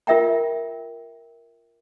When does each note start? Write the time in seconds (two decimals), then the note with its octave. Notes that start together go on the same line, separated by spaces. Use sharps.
0.07 F4 A#4 E5 G5 A#5